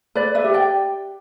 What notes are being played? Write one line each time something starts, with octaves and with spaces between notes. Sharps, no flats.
B4 D5
B4 E5
G4
D5 G5